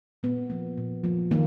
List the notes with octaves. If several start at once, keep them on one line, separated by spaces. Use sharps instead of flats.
A#2 B3
F3 A#3
A#2
F3 A#3
D#3 A#3